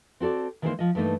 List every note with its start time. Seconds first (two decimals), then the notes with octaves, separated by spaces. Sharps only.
0.20 C4 F#4 A4 D5
0.62 D#3 E3 G#3 A#3 D#4 C5
0.79 F3 D#5
0.95 G2 E3 A3 A#3 D#4